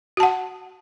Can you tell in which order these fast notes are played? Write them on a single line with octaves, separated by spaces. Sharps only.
F#4 A5 F#5